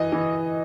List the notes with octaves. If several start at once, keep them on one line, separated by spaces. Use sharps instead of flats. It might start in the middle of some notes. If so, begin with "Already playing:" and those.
Already playing: E3 D#5
E3